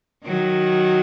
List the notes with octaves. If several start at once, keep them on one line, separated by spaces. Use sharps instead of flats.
D#3 F#3